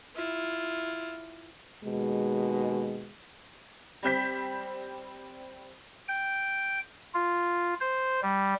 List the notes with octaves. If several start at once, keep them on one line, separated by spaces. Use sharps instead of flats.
E4 F4
D#2 B2 G#3
G3 C4 G6 B6
G5
F4
C5
G3